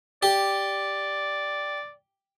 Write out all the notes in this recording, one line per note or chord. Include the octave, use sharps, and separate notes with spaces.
G4 D5